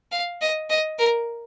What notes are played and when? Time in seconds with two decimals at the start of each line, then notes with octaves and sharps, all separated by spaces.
0.12 F5
0.41 D#5
0.70 D#5
0.99 A#4